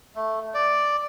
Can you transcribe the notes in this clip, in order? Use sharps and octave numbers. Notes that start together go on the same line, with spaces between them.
A3
D5